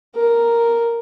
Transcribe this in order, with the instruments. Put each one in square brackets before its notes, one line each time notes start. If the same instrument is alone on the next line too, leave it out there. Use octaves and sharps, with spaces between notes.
[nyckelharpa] A#4